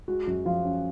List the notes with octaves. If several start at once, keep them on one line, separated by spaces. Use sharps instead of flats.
G#3 F#4
F#2 F#4
F3 F4
C#4